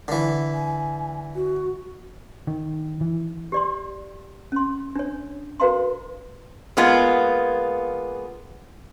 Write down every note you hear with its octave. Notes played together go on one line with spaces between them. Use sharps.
D3 E3
G#5
F#4
D#3
E3
G4 D5 C6
C#4 C6
D4 C#5
F#4 A#4 B4 F5 A#5 C6
G#3 A#3 B3 F4